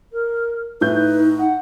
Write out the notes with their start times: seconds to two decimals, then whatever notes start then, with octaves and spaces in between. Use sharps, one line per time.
0.13 A#4
0.81 A2 D#4 B4 G6
1.39 F#5